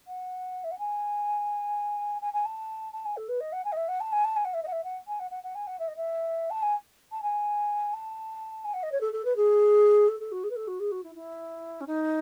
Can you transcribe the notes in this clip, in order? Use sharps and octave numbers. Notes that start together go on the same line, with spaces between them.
F#5
E5
F#5
G#5
G#5
G#5
A5
A5
G#5
A4
B4
D#5
F#5
G#5
D#5
E5
F#5
A5
G#5
A5
G#5
F#5
E5
D#5
F#5
E5
F#5
G#5
F#5
F#5
F#5
G#5
F#5
E5
D#5
E5
A5
G#5
A5
G#5
A5
G#5
F#5
D#5
C#5
A4
A4
B4
G#4
A4
A4
F#4
G#4
B4
A4
F#4
G#4
F#4
E4
E4
C#4
D#4